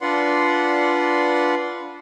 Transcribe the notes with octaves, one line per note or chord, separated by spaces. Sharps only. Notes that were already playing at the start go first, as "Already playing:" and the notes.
D4 F4 B4 D5 F#5 C6